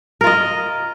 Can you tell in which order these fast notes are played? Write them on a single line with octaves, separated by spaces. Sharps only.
A#4 F4 D#5